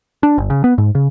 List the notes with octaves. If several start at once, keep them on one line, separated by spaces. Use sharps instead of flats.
D4
G1
C#3
B3
G#2
C#3